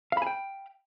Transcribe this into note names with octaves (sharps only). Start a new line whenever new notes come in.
F5 G5 G#5 B5